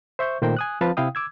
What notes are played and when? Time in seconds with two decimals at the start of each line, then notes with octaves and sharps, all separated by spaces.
0.19 C5 E5 C#6 G6
0.42 A#2 D#3 A3 A#4 C5 G5
0.57 G#5 D#6 F#6
0.81 F3 C4 B4 F5 A5
0.97 C3 E4 F5 G5 D#6
1.15 D6 E6 G#6